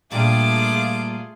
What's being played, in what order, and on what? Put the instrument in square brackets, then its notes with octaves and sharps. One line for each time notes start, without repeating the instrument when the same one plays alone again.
[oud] A#2 G3 D4 [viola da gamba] A3 F4 G#4 [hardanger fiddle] A5 D6